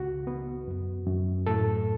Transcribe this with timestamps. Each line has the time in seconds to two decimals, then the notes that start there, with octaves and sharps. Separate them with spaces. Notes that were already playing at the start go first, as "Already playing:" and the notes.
Already playing: C#2 F#4
0.27 B3
0.68 F#2
1.06 F#2
1.47 A2 A4